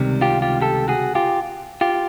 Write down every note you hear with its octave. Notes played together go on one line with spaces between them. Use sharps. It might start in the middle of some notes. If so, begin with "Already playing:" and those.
Already playing: C#2 C3 D#3 G3
F4 G4
F4 G4
G4 A4
F#4 G#4
F4 G4
F4 G4